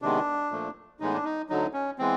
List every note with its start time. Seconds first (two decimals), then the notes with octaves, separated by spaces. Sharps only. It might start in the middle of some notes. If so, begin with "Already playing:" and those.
0.02 C3 D#3 G#3 B3 D4
0.52 A#2 F3 A3
1.00 A2 E3 G#3 B3 D#4
1.14 D4
1.25 D#4
1.49 D2 D3 F#3 D#4
1.73 C#4
1.99 E3 G#3 B3 C4